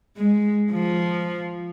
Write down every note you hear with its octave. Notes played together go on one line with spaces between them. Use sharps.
G#3
F3